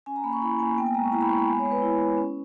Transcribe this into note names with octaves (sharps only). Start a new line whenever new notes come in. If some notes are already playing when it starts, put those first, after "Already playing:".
C#4 G#5
A#5
A#3 B5
C#6
E4 B5
A#3 G#5
B3 G5
G#5
G#3 A#5
C#6
E4 A#5
B5
G#3 C#6
B5
B3 G#5
C#5
G#3
B4
E4
G#3
C#4